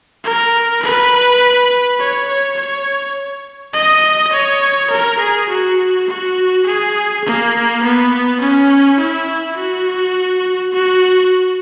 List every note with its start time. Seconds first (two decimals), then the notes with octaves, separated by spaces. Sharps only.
0.24 A#4
0.82 B4
2.00 C#5
2.28 C#5
2.57 C#5
3.73 D#5
4.33 C#5
4.90 A#4
5.19 G#4
5.49 F#4
6.08 F#4
6.66 G#4
7.25 A#3
7.83 B3
8.41 C#4
8.99 E4
9.57 F#4
10.73 F#4